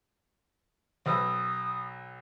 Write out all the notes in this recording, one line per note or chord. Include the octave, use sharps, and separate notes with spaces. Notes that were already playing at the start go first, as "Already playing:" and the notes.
B1 B4 D#6 E6